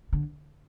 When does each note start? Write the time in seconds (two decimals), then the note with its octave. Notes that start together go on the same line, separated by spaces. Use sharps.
0.13 D3